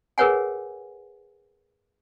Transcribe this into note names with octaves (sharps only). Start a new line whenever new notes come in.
G#4 A#4 B4 C#5 F#5 G#5